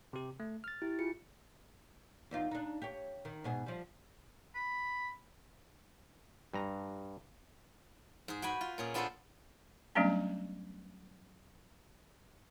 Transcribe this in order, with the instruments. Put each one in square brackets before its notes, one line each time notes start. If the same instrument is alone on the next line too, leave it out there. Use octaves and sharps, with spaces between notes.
[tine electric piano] C3 G4
A3
F6 A6
[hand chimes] E4 G4
F4 G#4 C#7
[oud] E2 D#4 F4
D4 D#4
G4 C#5
D#3
G#2 B2 G#4
F3 G3
[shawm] B5
[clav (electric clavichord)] G2 A#5
[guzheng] G#2 G#4
F#4 G5 G#5 B5
F4
A#2 C#4 G#4
B3 D4 F4 A4 B4 C5
[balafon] F#3 G3 A3 B3 C#4 D4